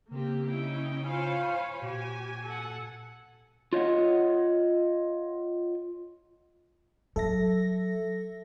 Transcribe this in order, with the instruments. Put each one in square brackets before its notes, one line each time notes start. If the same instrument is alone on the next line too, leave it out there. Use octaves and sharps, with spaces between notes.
[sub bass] C#3 [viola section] A#3 C4 G4
[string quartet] C#4 D#4 G5 [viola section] E4
[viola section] F4 C5 F5 [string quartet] C#5 G#5 B5
[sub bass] A#2 [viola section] F#4 G#5 [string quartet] G4
[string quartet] A4 F#5
[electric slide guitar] F4 C#5 D#5 F#5
[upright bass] F#3 [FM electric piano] A4 E5 A#6